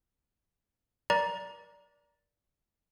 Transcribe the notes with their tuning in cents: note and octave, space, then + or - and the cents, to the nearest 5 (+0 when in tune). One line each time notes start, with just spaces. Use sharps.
A#4 +45 D5 -10 A#5 +10